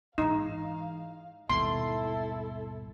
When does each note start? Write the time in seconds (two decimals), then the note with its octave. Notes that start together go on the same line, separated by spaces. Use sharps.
0.18 G#2 E3 D#4 F5
1.50 G#1 D#2 B2 G3 E4 A4 C6